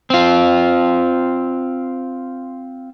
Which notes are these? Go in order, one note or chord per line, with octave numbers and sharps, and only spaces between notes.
C4 F4